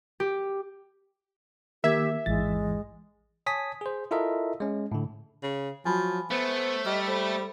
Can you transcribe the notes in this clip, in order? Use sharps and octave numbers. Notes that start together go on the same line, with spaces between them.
G4
D#3 A#3 G4 A#4 E5 G#6
A1 E2 G#2 E3 G#3 A6
C#5 G#5 A5 D#6 B6
G#4 C5
E4 F4 A4 A#4 D#5 E5
G#3 C#4
A2 D3
C#3
F3 F#3 G#5 A5 B5
A3 B3 C5
G3 D#5 F6
A4 C5 B5